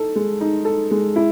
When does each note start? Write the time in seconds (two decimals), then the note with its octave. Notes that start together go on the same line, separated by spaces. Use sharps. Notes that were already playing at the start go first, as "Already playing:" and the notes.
Already playing: D#4 A4
0.16 G#3
0.41 D#4
0.65 A4
0.91 G#3
1.16 E4